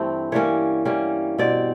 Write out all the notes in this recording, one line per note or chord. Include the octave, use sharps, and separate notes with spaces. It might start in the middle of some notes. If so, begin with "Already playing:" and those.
Already playing: G2 E3 A3 C4
E3 G3 A#3 C#4 C#5
E3 G3 A#3 C#4
B2 G3 C4 D5